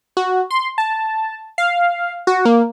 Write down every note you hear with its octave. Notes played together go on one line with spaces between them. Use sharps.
F#4
C6
A5
F5
F#4
A#3